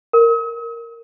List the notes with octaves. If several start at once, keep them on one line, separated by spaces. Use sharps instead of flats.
A#4